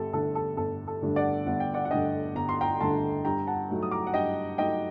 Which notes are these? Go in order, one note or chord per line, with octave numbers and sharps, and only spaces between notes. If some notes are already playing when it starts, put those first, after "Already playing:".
Already playing: G1 G4 A4
G2 D3 A3 D4 A4
A4
G1 A4
A4
G2 D3 A3 D4
D5 F#5
G1 F#5
G5
D5 F#5
F#5
G2 D3 A3 D4 D#5 G5
G1 A#5
C6
G5 A#5
G2 D3 A3 D4 A5 C6
G2 G5 A#5
F#5 A5
F#3 A3 D#4
D#6
A#5 D6
F#5
G2 D#5 G5
F#3 A3 D#4 D#5 G5